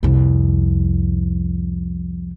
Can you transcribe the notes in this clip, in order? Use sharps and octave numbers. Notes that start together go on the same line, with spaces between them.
C2 F2